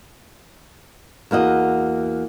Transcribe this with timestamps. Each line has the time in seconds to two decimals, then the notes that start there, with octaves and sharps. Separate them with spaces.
1.31 E2 A#3 F#4 D#5